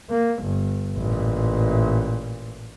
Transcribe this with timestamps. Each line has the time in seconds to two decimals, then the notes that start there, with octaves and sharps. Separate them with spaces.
0.10 A#3
0.43 G1
0.96 A1 A#2